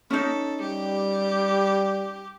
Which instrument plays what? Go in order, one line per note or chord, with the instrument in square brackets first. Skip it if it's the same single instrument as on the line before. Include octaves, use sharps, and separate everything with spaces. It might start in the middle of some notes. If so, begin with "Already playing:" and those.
[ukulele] C#4 D#4 [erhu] A4
[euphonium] G3 [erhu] G4